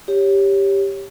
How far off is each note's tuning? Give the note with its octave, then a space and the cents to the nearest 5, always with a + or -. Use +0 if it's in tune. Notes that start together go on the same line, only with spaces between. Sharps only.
G4 +5 C#5 +0